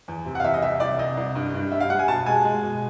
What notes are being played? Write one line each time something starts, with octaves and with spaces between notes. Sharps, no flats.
E2
C3
F#5
F5
E2 E5
D#5
C2 E5
C2 D5
C2 D#5
C2
G2
G2
G3 E5
F5
G3 F#5
G#5
B2 A5
G#3 G#5
G#3
B2